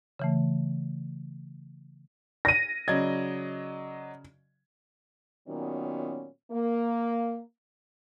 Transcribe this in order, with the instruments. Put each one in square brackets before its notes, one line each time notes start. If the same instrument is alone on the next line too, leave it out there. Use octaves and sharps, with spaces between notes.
[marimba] C#3 E3 A3
[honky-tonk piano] A#6 D#7
[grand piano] C#3 G#6 [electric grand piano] F#3 D5 D#5
[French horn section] A#2 D#3 F#3 B3 C#4
A#3